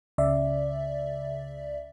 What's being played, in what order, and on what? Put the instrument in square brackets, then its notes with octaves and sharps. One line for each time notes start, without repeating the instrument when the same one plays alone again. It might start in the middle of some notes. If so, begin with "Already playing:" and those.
[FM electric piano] C#2 C#3 D5 E5